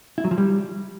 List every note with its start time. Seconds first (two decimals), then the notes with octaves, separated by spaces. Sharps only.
0.18 E4
0.24 F#3
0.31 F3
0.38 G3